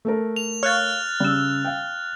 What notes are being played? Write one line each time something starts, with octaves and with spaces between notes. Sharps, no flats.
A3 A4 A#4
F7
C#5 F5 F6 F#6 A6
C#3 G3 E6
F5 G5